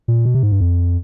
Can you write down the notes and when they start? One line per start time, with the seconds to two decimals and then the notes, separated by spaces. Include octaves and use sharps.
0.08 A#2
0.25 B2
0.35 C3
0.43 G#2
0.52 G2
0.61 F2